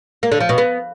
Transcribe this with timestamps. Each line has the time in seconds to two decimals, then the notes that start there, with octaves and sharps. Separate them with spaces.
0.23 A#3
0.32 D3
0.40 F3
0.49 B2
0.58 B3